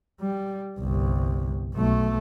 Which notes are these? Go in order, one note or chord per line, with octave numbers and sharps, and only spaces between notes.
G3
G1 C2
B1 A3